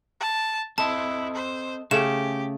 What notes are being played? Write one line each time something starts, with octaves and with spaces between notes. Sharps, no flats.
A5
C4 E4 A4 D#5 A5
C5
C#3 A3 G4 G#4 E7